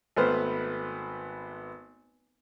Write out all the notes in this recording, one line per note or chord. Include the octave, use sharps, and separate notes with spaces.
G#1 A3 B3 B4 C5 F6